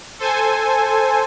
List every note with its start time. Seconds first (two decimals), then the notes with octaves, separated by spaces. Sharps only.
0.19 A4 C5 G#5